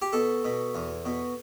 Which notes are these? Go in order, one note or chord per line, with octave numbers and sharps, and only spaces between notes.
G4
B2 A4
B2
E2
B2